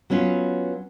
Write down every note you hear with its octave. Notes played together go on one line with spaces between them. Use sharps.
F#3 B3 C#4 F4